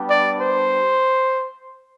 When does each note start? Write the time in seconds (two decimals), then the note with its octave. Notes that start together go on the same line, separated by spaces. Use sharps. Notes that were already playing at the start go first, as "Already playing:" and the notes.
Already playing: G3 B3 D4 G4
0.09 D5
0.39 C5